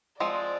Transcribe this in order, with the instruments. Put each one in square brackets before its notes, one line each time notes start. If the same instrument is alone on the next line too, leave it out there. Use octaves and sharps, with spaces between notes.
[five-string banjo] F3 G#3 C4 [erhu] D5